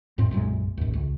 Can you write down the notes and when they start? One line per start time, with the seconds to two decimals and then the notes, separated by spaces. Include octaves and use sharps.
0.18 F2 A2 C4
0.31 B1 F#2 A#2 G#3
0.77 A1 D#2
0.93 C#2